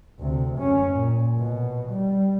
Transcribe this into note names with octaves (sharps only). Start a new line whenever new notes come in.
D2 C3
F#2 C#4
A#2
B2
G3